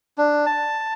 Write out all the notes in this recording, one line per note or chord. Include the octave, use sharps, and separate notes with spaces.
D4
A5